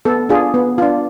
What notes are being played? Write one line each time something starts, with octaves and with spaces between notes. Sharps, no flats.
B3 A4
D4 F4 G#4
B3
D4 F4